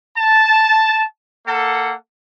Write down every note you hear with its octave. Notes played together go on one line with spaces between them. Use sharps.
A5
A#3 A4 F#5